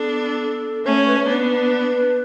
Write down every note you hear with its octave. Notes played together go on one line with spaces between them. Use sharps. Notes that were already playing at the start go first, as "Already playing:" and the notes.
Already playing: B3 D4 A4
A3 C#4 C#5
C#5
B4
C#5
B3 D4 B4